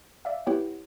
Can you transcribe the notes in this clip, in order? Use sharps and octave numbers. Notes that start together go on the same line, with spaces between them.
D5 E5 F5
B3 E4 G4 C#5 F#5 G5